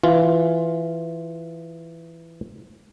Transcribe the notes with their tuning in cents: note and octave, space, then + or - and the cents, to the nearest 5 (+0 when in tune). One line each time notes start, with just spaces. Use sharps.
E3 +10 F4 +0